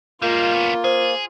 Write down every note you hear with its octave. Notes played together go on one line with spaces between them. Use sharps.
G3 G#3 A#3 F4
B3 C#4
G#4 C5